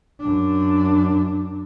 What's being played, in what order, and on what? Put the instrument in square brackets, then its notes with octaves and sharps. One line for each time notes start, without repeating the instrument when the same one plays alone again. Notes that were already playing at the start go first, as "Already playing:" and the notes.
[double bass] F#2 D4